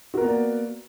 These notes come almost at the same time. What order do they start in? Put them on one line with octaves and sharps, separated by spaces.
F#4 A#4 B3 A#3 D5